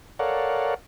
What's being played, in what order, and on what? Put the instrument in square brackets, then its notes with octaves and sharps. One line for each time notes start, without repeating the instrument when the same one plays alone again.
[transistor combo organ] A4 A#4 C#5 D5 F5 F#5